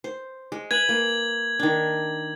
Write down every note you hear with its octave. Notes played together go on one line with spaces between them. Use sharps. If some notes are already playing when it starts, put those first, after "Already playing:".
C5
G#3
B4 G#5 G#6 F#7
A#3
D#3 D4